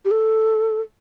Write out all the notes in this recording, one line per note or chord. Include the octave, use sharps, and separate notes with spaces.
G4
A4